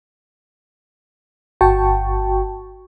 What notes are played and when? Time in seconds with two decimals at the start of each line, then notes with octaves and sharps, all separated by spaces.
1.61 G1 F#4 G5 A5 C#6